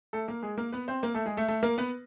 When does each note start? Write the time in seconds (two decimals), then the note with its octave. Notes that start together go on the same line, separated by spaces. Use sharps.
0.13 A3 A4
0.28 A#3 A#4
0.42 G#3 G#4
0.58 A#3 A#4
0.72 B3 B4
0.88 C4 C5
1.03 A#3 A#4
1.14 A3 A4
1.26 G#3 G#4
1.37 A3 A4
1.48 A3 A4
1.63 A#3 A#4
1.78 B3 B4